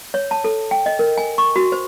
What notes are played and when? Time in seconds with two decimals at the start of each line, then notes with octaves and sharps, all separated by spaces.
0.14 C#5
0.31 A5
0.44 A4
0.71 G5
0.86 D#5
0.99 A#4
1.18 G#5
1.38 C#6
1.56 F#4
1.72 C5